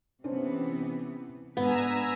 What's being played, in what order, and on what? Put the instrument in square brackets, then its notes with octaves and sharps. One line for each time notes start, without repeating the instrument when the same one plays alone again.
[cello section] C3 E3 B3 [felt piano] C#4 D4 C5
[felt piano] G#2 [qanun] B3 [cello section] D4 B4 [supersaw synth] G#5 A#5 E6